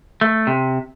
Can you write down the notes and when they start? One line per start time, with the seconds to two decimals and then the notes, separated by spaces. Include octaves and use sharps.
0.21 A3
0.47 C3